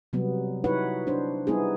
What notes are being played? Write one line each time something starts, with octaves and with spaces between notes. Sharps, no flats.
C3 F#3 G3 B3
D#4 E4 F#4 B4 C#5 F#5
D4 C5
G3 B3 D#4 E4 G#4